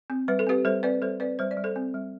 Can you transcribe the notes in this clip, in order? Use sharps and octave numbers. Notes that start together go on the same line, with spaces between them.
C4
G3 B4
A4
C4 G4 B4
G3 A4 C5
C4 B4 D5
G3 A4 C5
C4 B4 D5
G3 C5
D5
G3
A4 C5
C4
G3